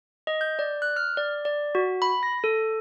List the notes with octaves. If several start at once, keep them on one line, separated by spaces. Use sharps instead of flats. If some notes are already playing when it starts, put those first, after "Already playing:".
D#5
G6
D5
F#6
F6
D5
D5
F#4
B5
A#6
A4